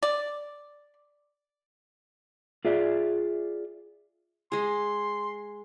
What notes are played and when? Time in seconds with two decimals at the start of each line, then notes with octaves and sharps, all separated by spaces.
0.03 D5
2.65 F4 G#4 D5 E5
4.52 G#3 G#4 C6